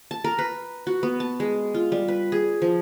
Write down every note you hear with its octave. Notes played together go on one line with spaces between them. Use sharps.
A5
A#4
B4
F#4
B3
A5
G#3
F4
G3
B4
G#4
F3